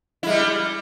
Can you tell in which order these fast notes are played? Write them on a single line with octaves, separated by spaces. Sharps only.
E4 G#3 G3